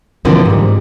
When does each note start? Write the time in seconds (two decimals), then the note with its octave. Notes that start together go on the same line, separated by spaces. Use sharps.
0.25 B2 D3 E3 F3 A#3 C4
0.46 G#2 G3